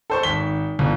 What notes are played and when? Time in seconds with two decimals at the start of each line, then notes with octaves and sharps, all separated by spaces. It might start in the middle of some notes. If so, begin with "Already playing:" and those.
0.10 A4 C5 C#6
0.23 G#1 B6 G7
0.79 G1